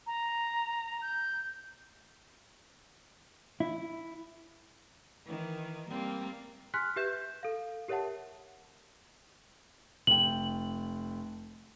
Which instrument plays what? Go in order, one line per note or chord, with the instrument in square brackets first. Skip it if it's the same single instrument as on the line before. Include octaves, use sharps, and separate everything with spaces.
[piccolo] A#5
G6
[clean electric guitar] E4
[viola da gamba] D#3 E3
G3 A#3 C4
[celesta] G#5 C6 F6 F#6 B6
G4 B4 E5 G6 E7
G6
A4 F5
G4 A#4 C#5 E5 F#5 A5
[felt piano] F1 G5 [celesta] F#7